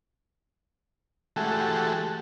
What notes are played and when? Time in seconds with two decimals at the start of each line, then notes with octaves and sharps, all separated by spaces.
1.36 E3 G#3 A3 F#4 G4 A4